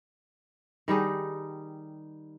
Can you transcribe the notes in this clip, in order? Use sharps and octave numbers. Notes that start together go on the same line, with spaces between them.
D#3 G3 D#4 G#4